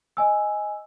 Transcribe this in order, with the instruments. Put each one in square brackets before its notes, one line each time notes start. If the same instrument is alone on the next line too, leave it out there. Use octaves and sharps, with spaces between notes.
[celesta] D#5 G#5 E6